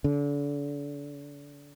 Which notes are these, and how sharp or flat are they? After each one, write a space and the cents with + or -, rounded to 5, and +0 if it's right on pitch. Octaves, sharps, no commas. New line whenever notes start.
D3 -35